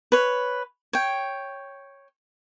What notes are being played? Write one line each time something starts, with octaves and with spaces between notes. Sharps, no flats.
B4 C#5
C#5 G5